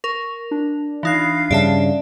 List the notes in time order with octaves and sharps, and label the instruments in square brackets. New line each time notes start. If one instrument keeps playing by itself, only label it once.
[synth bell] A#4 [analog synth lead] C#6
[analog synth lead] D4
[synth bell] E3 D#4 F#6 [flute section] F4 F5
[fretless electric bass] G2 C#3 [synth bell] D5 E5 A5